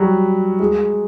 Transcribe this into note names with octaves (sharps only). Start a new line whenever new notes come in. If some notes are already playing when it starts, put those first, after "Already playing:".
Already playing: F#3 G3
G#3